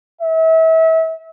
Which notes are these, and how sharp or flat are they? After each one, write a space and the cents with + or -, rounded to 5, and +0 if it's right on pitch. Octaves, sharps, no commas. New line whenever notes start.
E5 -35